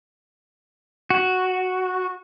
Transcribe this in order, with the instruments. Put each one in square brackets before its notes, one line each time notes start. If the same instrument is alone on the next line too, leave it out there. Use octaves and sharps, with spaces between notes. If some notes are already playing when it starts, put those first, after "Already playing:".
[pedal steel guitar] F#4